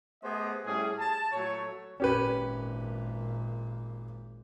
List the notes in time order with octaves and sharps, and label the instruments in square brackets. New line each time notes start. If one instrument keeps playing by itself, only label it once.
[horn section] A3 B3 G4 G#4 C5 D#5
A2 G3 C#4 G#4
A5
A#2 F#3 A3 C#5
[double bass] G#1 A#2 [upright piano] C#4 G4 B4